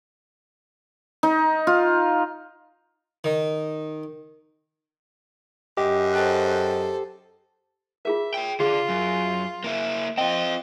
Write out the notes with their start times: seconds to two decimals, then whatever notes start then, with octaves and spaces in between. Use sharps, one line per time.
1.23 D#4
1.67 F4
3.24 D#3
5.77 F#2 G4 D#5
6.13 A4 C5 D#5 G5 F#6
8.05 F4 G#4 A#4 E5
8.34 C#5 G5
8.60 D3 F4 G#4
8.89 F#2
9.64 A#3 E4
10.18 C4 F4 D#5 G5